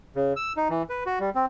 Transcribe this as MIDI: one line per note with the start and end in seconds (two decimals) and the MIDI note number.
0.16 0.33 49
0.36 0.53 88
0.57 0.68 63
0.70 0.83 52
0.90 1.04 71
1.06 1.19 66
1.20 1.30 55
1.35 1.45 60